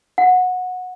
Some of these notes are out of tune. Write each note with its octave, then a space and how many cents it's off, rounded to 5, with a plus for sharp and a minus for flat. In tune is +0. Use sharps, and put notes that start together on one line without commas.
F#5 -15